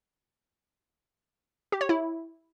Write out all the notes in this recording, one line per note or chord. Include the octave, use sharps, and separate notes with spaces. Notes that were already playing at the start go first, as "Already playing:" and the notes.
G4
C#5
E4